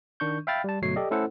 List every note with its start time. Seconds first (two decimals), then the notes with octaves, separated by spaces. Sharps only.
0.20 D#3 D4 C#6 G6
0.47 E5 F5 G5 B5 F6 A6
0.64 G3 A5
0.82 G1 B2 F#3 A3 C#5 C7
0.96 G4 A4 D5 D#5
1.10 A3 C#4 E4 A4 C5 F#5